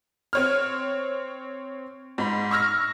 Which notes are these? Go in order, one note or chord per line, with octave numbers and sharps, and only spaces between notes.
C4 C#5 F6
G#2 B5
C#6 E6 F6 A#6